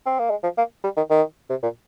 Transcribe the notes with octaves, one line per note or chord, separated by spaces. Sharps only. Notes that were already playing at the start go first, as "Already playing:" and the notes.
C4
A#3
G#3
F3
A#3
G3
D#3
D#3
C3
A#2